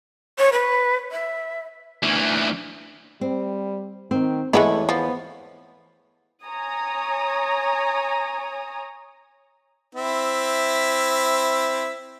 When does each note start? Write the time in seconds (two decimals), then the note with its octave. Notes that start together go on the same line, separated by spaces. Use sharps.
0.39 C#5
0.52 B4
1.11 E5
2.03 D2 E3
3.21 G3 C4
4.11 D#3 C4
4.53 E2 G#3 A3 B3 E4 C#5
4.89 F3 B3
6.45 C#5 G#5 A#5 D#6
9.95 C4 E4 E5